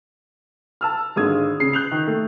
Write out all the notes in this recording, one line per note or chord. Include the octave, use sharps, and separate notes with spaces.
A5 E6 F6
G#1 D3 G#3 D#6 G#6
C#3 C7
F#6 G6 C7 F7
D#3
A3